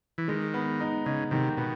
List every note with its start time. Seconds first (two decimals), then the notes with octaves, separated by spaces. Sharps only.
0.18 E3
0.28 D#3 G#3
0.54 B3
0.80 D#4
1.05 C#3 D#4
1.31 C3 D#3
1.57 B2 B3